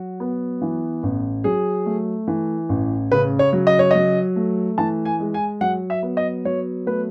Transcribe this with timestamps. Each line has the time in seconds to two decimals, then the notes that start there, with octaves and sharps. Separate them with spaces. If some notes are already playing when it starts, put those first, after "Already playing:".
Already playing: F#3 F#4
0.20 B3
0.62 E3
1.03 A1
1.44 F#3 G#4
1.86 A3
2.28 E3
2.69 A1
3.12 C#3 B4
3.39 C#5
3.53 F#3
3.67 D#5
3.79 C#5
3.91 F#3 D#5
4.36 A3
4.78 E3 A5
5.05 G#5
5.20 G#3
5.34 G#5
5.61 F#3 F#5
5.90 E5
6.03 B3
6.17 D#5
6.45 F#3 C#5
6.86 A3 B4